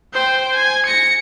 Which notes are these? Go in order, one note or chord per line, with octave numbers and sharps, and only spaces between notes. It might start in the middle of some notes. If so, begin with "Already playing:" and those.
C5 G5
G#5
A#6 C#7